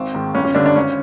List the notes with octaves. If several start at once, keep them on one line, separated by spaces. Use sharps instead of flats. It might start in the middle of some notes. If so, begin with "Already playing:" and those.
Already playing: G#1 C4
G#2 D#3
G1 C#4
C#4
G2 D3 D4
D4
G#1 C#4